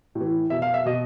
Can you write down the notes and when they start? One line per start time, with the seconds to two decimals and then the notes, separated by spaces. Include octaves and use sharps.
0.15 A2
0.21 E3
0.50 B2 E5
0.62 F5
0.74 E5
0.86 B2 D#5